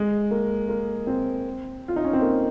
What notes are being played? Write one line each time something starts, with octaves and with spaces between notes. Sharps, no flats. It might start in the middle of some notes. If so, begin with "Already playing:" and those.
Already playing: G#3
A#3
A#3
C4
F4
D#4
C#4
C4
A#3